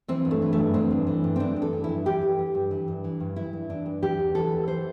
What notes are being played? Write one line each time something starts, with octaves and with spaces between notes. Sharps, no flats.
E3 C4
G2
A3
E3
A3
G2
E3 C4
G2
E3
G2
C4
E3 D4
G2
A4
E3
E4
G2
E3 G4
G2
E3
G2
E3
G2
E3
G2
E3 E4
G2
E3 D4
G2
E3 G4
E2
E3 A4
E2
E3 C5